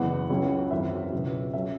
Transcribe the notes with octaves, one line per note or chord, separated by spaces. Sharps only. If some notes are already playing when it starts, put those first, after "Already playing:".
Already playing: F#1 E2 E3 B3 F#5
C#2 C#3 F#3 C#4
G#1 F#2 E3 E5
C#2 B2 F#3 B3
F#3 C#4 E5